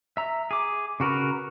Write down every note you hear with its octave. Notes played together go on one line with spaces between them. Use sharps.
E5 A#5
G#4 D6
C#3 F#4 A#4 B4